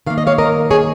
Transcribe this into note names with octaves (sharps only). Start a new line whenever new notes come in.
D#3 A#3 F5
D#5
C#5 F5
A#4 D#5
G#4 C#5